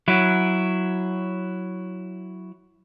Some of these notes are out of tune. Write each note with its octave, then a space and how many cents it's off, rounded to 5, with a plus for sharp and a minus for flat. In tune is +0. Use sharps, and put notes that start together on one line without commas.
F#3 +0 E4 +0